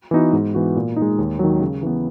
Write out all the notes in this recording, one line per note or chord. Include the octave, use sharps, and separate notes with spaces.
E3 B3 D#4 F#4
G#2
E3 B3 F#4
A#2
D#4
G#3
D#2
D#3 F#3
C#3
E3 B3